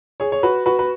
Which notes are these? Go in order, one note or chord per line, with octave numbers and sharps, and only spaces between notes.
G#4 C#5
C#5
F#4 B4
F#4 B4
B4